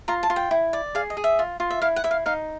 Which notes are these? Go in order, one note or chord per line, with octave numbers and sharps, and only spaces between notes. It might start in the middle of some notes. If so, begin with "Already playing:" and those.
F4 A#5
A5
F4
G5
E4
D5
G#4 F5
D#5
G#4
E5
F4
F4
E5
E4 F5
F#5
E4 E5
F5
D#4 F5